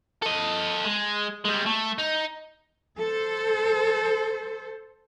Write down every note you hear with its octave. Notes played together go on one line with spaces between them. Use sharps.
A4 D#5
G#3
G3 G#3
A3
D#4
A4 C5